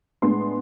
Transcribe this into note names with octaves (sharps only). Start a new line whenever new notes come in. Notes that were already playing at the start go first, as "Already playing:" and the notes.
A2 G#3 B3 D4 C6